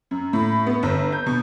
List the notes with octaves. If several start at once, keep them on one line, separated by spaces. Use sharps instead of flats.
F#2
A2
B3
G1
G6
B2